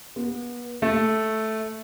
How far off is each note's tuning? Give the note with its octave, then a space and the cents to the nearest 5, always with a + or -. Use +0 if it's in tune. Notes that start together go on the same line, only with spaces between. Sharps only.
B3 -30
A3 -5